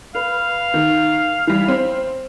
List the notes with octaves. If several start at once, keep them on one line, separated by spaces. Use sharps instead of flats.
B4 F5
D#3
E3 G3
C4